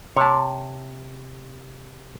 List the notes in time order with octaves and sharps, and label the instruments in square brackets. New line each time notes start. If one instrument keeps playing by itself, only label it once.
[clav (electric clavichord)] C3 [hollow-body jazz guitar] C#5 A5